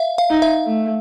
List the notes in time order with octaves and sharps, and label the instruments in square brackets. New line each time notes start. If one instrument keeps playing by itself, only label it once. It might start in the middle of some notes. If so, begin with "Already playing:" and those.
Already playing: [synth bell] E5 F5
F5
[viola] D#4
[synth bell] E5
[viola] A3